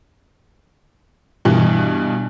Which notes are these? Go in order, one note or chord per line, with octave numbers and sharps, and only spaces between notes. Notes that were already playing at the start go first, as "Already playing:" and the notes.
G2 B2 E3